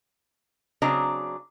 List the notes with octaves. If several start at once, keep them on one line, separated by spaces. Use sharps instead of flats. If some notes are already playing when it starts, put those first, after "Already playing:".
C#3 F#3 C4 D4 D#5 A#5